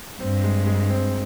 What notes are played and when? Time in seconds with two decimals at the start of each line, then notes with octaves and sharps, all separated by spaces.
0.20 G2 C4
0.44 G#3
0.67 G#3
0.90 C4